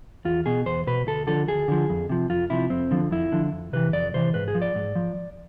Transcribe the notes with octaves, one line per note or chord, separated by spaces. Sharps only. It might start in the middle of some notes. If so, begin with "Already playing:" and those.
E2 F4
B2 G#4
E2 C5
B2 B4
D2 A4
D3 F3 A4
D2 G#4
D3 F3
F2
C3 F3
F2 F4
C3 F3 E4
F2 C4
D3 F3
F2 E4
D3 F3
F2
C3 E3 B4
F2 D5
C3 E3 C5
G#2 B4
G#4
F3
D5
G#2
F3